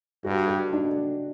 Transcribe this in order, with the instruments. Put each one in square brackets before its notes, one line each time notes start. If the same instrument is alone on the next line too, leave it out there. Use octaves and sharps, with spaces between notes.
[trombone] G2 [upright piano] F#4
[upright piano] G4
F#4
D4